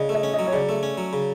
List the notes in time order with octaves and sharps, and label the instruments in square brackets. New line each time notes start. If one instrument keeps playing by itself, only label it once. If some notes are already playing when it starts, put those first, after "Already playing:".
Already playing: [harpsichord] C#3 [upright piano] D5 D#5
[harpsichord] A3
[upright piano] D#5
[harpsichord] C#4
[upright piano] D#5
[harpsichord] F#3
[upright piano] C#5
[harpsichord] C#3 [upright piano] D5
[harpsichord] A3
C#4
F#3
C#3